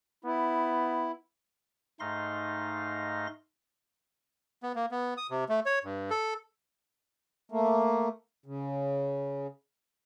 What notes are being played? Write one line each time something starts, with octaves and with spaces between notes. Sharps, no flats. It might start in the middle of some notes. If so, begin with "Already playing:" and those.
B3 E4
G#2 A3 D#4 F5 C6 A#6
B3
A#3
B3
D#6
C3
A3
C#5
G2
A4
A3 A#3
C#3